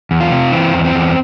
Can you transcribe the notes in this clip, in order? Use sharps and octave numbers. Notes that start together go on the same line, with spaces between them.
E2
F4
C3
E3 C4
E2
C4
E2